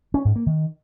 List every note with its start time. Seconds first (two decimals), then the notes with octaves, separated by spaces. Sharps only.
0.14 C#4
0.25 G#2
0.36 A#3
0.46 D#3